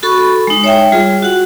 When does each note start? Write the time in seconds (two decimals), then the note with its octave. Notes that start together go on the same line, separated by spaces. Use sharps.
0.03 F#4 A4 B5 C#6
0.47 G#3 D#4
0.64 C#5 E5 G5
0.92 G3 F4 G#4
1.22 F#4 F#5